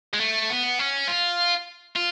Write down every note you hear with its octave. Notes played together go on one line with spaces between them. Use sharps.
G#3
A3
B3
C#4
F4
F4